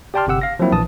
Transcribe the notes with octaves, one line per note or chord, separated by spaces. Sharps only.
G4 D5 G5 A5 C6 F6
G1 C3 G4 F#5 E6
F5 A#6
F3 F#3 A#3 C4 E4
A#1 E3 A5 D#6